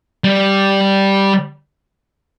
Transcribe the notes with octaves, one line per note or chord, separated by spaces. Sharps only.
G3